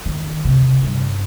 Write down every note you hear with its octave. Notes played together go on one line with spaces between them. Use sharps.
D#3
C3
G2